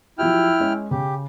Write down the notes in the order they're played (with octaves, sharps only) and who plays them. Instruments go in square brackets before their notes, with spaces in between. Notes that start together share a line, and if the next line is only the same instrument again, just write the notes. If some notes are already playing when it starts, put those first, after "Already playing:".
[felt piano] F3 F#3 G4 [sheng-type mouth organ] E4 G5 F6
[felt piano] G#3 C#4
[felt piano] C#3 [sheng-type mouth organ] G4